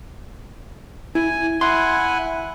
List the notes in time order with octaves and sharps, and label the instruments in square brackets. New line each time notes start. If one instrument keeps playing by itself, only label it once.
[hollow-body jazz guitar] E4 [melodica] G#5
[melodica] E4 F#5 G#5 [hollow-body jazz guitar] C6